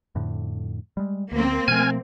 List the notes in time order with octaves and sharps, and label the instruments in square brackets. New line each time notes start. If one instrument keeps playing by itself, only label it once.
[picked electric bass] F2 A2 D3
G3 G#3
[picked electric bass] D2 [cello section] A#3 C4
[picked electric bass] B2 F3 A3 [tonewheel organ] G#5 F6 G#6